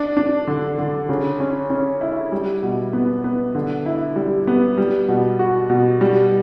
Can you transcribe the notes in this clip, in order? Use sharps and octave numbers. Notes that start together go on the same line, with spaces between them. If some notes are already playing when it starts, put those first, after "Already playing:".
Already playing: D4
D4
D3
D3
C#3
C#4
C#4
E4
G3
B2
B3
B3
D3
E4
G3
B3
G3
B2
F#4
B2
G3